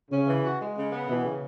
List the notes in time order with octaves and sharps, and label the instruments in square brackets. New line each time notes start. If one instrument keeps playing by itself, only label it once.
[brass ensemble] C#3 [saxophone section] C#4
[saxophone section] E3
F#4
G#3
C#3
B3
[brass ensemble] B2 [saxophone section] E3
[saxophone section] C#3